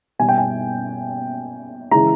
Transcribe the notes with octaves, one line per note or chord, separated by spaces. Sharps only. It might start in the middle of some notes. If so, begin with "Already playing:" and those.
B2 G3 G#5
G5
G#5
C#3 E3 G#3 A#5